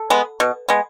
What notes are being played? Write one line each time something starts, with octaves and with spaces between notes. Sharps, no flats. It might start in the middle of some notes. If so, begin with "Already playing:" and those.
Already playing: A4
G#3 B3
B2
G#3 B3